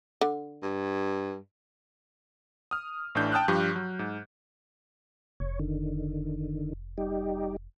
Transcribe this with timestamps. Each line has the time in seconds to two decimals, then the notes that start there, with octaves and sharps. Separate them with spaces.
0.21 D3
0.62 G2
2.71 D#6 F6
3.15 A1 A2 E3 D4 G6
3.32 G5 A5 D#6 F6 F#6
3.48 G2 F3 G4 G6
3.76 F#3
3.99 G#2
5.40 F1 C#5
5.60 D3 D#3
6.98 G3 D#4 G4